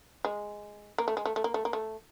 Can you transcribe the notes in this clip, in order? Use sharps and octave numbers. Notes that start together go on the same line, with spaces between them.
G#3
A#3
A3
G#3
A3
A3
A#3
A3
A#3
A3